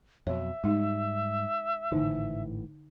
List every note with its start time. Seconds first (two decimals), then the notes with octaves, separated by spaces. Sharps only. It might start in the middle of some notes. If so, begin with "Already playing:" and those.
0.27 F2 B2 F#3 C#5 E5
0.64 G#2 G3 G#3 D#4
1.92 G#1 A2 D3 E3 D#4